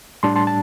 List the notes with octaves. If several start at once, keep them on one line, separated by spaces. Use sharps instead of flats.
A2 G3 D4 A5 C6
A5 C6
A5